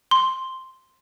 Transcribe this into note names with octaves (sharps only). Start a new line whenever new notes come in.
C6